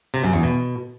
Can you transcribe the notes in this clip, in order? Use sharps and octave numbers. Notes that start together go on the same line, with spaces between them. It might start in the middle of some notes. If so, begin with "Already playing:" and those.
C3
F#2
E2
B2